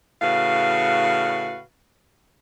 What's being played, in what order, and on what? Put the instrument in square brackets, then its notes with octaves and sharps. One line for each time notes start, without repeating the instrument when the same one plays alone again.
[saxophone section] A2 C#3 F#4 B4 F5